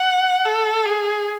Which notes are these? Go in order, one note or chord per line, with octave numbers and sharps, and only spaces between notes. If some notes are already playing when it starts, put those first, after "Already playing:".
Already playing: F#5
A4
G#4